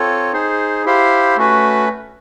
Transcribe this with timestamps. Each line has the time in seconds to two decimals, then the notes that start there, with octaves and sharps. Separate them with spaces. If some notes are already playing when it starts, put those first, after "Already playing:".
Already playing: C4 F4 A4 C#5
0.33 D#4 G#4 C5
0.85 E4 G4 C5 F5
1.37 A3 C#4 F#4 B4